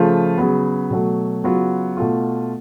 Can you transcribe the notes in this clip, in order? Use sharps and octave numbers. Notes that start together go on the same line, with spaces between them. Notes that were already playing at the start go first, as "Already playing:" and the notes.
Already playing: C#3 F3 A3 F4
C#3 F#3 B3
B2 F#3 A3
C#3 F#3 B3 F4
B2 A3 F4